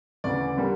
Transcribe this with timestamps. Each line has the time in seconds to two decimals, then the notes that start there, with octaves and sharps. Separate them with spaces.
0.24 D2 C#3 E3 D5
0.57 D3 G3 A#3 D4